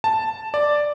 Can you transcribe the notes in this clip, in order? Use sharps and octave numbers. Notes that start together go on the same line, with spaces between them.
A5
D5